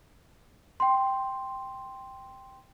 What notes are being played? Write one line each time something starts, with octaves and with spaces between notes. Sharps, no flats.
G5 C6